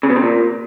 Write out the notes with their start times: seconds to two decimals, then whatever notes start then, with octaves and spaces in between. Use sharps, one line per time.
0.03 C#3
0.10 B2
0.16 C3
0.22 A#2